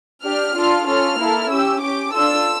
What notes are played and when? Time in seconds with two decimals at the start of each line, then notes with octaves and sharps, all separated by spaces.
0.25 D4 G4 F6
0.56 D4 F4 A4
0.87 C#4 F4 A4 F6
1.19 A#3 E4 A4
1.50 C#4 G4 E6
1.81 C#4 G4 D6
2.13 D4 F4 A4 E6